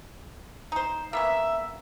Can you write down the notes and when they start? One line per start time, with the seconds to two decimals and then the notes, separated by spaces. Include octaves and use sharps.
0.72 D#4 C5
1.13 A#3 B3 C#4 E5